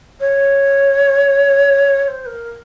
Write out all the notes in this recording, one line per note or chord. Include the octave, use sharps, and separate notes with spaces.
C#5
C#5
C5
A#4